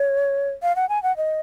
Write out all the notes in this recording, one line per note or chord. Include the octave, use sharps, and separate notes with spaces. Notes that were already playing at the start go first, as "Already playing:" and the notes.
Already playing: C#5
F5
F#5
G#5
F#5
D#5